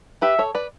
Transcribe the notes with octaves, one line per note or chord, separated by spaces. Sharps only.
G4 B4 E5
A4 C#5
B4 D5